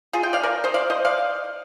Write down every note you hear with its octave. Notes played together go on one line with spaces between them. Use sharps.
F4 G#4
D#5 G5
D5 F5
A#4 D5
C5 D#5
D5 F5
C5 D#5
D5 F5